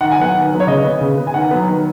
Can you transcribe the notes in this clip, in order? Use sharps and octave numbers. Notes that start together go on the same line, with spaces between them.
D#3 F#5
G#5
F#3 B3 F#5
D#3
F#3 B3
C#5
C#3 D#5
B3
C#3
B3
G#5
D#3 F#5
F#3 B3
D#3